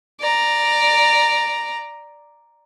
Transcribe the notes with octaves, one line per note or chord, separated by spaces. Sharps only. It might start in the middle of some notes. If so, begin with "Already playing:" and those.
D5 A#5